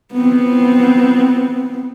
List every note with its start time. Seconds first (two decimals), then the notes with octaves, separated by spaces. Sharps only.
0.13 B3 C4